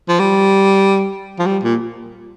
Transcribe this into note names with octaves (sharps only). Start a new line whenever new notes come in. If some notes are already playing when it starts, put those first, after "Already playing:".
F3
G3
F3
G3
A#2